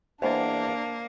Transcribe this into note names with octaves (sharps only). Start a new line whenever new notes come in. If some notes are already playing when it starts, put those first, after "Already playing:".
E2 A#3 D4 C5 D#5